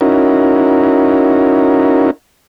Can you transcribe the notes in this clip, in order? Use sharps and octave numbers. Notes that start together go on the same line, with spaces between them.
C#4 D#4 E4 F#4 A#4